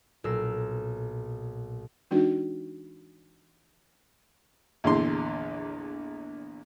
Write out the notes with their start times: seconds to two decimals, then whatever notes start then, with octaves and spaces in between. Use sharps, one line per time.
0.24 B1 A#2 E6 F6 A#6 C7
2.11 E3 G#3 D4 D#4 F#4
4.84 A#1 E2 D3 C6